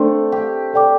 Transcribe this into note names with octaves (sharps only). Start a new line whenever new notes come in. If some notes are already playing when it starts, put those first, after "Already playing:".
Already playing: A3 C4 D4 A4 C5
G4
A4 D5 G5 D6